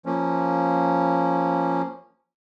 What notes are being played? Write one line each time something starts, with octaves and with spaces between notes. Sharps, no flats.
F3 A#3 C#4